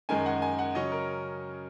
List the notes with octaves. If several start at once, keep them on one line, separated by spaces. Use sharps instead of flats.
F#2 D#3 G#3 G#5
F#5
G#5
F#5
C#3 F#3 C#4 D#5
A#4